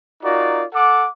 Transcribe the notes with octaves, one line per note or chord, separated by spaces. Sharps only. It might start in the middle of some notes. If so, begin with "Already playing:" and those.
D#4 F4 F#4 A#4 D5
A4 F#5 D6